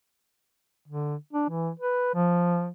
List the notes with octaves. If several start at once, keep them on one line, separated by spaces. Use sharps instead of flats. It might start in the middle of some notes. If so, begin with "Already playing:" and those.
D3
D4
E3
B4
F3